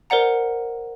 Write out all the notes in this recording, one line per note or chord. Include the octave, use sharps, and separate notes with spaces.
A#4 C5 D5 F#5 A#5